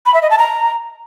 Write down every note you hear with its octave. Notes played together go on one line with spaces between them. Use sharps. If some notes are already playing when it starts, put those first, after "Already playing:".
B5
E5
D#5
A5
A#5